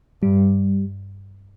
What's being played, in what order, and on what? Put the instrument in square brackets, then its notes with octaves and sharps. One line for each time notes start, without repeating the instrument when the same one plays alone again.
[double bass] G2 [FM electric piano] G3